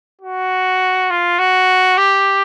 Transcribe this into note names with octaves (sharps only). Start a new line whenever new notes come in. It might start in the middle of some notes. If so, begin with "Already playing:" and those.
F#4
F4
F#4
G4